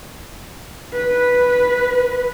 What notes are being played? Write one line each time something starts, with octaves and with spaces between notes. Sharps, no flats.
B4